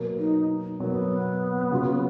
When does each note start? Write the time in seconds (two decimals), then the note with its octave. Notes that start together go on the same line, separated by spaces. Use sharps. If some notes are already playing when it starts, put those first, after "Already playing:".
Already playing: B2 F#3 A#3
0.18 D#4
0.80 B2 F#3 A#3 B3
1.71 C#3 F#3 C#4 F4